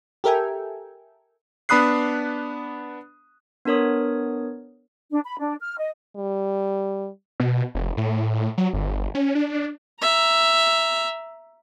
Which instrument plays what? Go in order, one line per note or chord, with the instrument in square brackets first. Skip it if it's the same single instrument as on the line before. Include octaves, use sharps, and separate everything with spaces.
[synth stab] G4 A4 A#4 E5 G5 G#5
[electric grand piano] B3 D4 B5 D#6 F#6 C7
[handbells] B3 D4 A#4 C#5 D#6
[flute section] D4
B5
D4
F6
D#5
[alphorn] G3
[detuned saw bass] B2
F1
A2
F#3
G1
C#4
D4
[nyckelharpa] E5 A#5